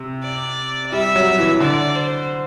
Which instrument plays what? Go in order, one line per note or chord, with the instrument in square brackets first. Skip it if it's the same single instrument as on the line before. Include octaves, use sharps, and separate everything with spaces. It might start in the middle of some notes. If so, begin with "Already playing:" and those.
Already playing: [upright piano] C3
[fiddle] D5
[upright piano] G3 [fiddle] E5
[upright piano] F#3
E3
[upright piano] D3 [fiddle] D5
[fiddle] C5